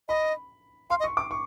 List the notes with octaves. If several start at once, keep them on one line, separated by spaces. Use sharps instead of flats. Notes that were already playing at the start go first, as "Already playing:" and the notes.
D#5 B5
F5 C6
D#5
C#6
D6
C#6